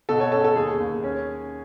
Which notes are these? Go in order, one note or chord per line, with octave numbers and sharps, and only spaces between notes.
B2 A4
C#5
C#4 A4
A4
D#2 G#4
D#2
C#4